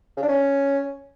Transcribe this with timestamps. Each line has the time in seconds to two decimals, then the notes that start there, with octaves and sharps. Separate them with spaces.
0.17 C#3
0.22 D4
0.28 C#4